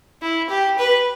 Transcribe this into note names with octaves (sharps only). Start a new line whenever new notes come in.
E4
G4
B4